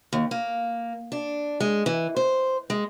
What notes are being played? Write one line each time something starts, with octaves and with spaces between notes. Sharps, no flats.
D#2
A#3
D4
G#3
E3
C5
G#3